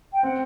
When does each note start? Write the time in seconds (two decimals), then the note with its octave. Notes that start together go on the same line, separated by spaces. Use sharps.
0.12 G5
0.23 C4 F#5